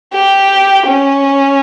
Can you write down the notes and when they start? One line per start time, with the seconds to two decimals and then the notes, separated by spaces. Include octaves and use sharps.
0.13 G4
0.87 C#4